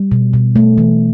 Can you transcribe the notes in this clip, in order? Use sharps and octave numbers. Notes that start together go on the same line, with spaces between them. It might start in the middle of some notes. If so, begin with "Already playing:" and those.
Already playing: G3
B2
B2
A3
E3